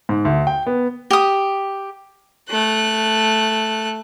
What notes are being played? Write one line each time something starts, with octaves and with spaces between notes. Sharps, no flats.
G#2
D2
G5
B3
G4 D#6
A3 F#6